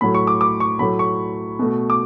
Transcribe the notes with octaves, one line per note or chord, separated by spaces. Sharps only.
A2 F#3 A3 B5
C#6
D6
D6
C#6
A2 F#3 A3 B5
C#6
B2 A3
D6